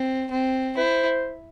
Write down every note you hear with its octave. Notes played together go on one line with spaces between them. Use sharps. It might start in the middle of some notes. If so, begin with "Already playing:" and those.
Already playing: C4
C4
E4 C5